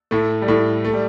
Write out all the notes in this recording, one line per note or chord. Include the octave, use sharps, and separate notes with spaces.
A2 A3
G3
A2 A3
A3
G3